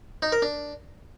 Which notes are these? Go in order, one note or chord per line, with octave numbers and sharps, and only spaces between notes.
D#4
A#4
D4